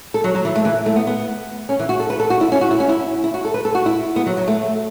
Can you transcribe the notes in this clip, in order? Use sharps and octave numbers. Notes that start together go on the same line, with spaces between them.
A4
F#3
F#3
E3
A3
E3
A3
B3
B3
C#4
E3
F#4
A4
B4
A4
F#4
E4
C#4
F#4
E4
C#4
E4
E4
F#4
A4
B4
A4
F#4
E4
B3
F#3
F#3
A3